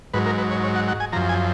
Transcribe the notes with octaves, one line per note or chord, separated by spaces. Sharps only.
G#2 F#3 B4
A#4
B4
C#5
C#5
F#5
F#5
G#5
F#2 F3 A#5
G#5